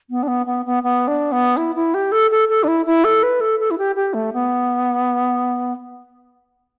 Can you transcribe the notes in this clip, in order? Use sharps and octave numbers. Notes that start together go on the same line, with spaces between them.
B3
D4
B3
B3
B3
B3
D4
B3
E4
E4
G4
A4
A4
A4
D4
E4
E4
A4
B4
A4
A4
E4
G4
G4
A3
B3